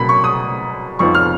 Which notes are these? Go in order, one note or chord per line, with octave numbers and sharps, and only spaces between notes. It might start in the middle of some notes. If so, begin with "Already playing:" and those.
Already playing: B2 F#3 A#3 C#4 B5
C#6
D#6
F2 F3 B3 D#4 C#6
F6